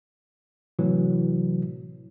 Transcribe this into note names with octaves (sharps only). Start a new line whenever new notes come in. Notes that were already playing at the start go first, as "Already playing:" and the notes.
A2 C3 E3 F#3